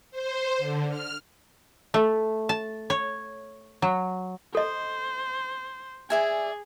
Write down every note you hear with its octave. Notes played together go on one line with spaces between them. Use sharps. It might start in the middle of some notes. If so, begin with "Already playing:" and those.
C5
D3
F6
A3
A5
C#5
F#3
A4 C5 D#5
G#4 D5 E5 G#5